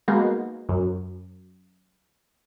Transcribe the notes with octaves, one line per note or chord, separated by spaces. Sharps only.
G#3 A#3 B3 D#4 F#4
F#2